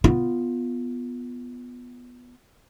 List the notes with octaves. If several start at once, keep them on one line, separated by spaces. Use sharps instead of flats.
B3 F4